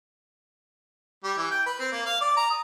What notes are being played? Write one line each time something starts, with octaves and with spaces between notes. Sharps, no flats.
G3
E3
G5
B4
C4
A#3
F5
D5
A#5
D#6